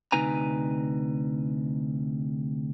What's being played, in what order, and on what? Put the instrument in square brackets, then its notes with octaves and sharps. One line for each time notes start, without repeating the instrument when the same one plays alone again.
[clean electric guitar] D2 C3 D#4 B4 G#5 A#5